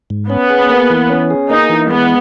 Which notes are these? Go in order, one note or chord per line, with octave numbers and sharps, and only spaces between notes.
G#2
B3 C#4
G#4
A#3
E3
C#4
G#4
A#3 D#4
E3
G#3 B3